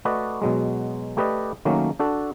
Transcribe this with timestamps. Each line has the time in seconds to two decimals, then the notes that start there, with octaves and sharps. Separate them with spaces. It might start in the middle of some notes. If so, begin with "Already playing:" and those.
0.05 A3 F#4 B4 D5 D#5
0.42 B2 F#3 G#3
1.17 A3 G4 B4 D5 D#5
1.65 D#3 F#3 A3 A#3 C#4
1.99 D4 F#4 A4